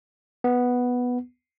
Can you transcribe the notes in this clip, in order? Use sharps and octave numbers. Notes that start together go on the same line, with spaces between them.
B3